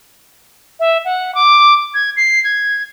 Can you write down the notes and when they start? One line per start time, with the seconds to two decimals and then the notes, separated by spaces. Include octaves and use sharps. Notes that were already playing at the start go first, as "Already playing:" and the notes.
0.80 E5
1.05 F#5
1.35 D6
1.94 G#6
2.17 C7
2.44 G#6